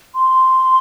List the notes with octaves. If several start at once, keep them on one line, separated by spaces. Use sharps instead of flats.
C6